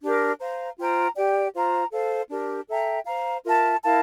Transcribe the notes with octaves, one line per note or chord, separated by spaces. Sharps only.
D4 G4 A#4
C5 F5 A#5
F4 C5 G5 A#5
G4 D5 G5
F4 C5 F5 A#5
A4 C5 F5
D4 G4 A#4
A4 E5 G5 A#5
C5 F5 A#5
F4 A#4 E5 A5
E4 A#4 F5 A5